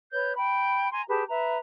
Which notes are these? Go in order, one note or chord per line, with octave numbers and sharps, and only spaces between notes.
B4 C#5 G6
G5 B5
G#5 A#5 C6
G4 G#4 B4 A5
B4 E5 A#5